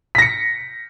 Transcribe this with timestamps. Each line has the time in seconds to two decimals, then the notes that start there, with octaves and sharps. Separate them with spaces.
0.15 B6
0.18 A#6
0.22 C#7